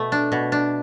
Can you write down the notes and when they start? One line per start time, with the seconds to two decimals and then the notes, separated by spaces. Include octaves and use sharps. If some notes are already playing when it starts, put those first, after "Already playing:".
Already playing: B2 A3
0.12 D4
0.32 B2
0.52 D4